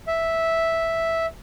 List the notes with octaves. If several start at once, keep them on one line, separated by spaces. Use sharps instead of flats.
E5